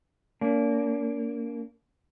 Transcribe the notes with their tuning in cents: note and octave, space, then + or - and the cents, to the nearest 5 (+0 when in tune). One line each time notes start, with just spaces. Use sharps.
A#3 -5 D4 -45